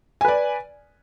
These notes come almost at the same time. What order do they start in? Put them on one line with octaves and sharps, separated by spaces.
G#5 B4 D5